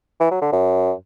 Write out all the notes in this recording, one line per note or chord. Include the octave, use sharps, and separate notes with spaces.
E3
F#3
D3
F#2